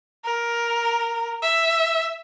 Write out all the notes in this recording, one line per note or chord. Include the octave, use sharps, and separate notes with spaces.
A#4
E5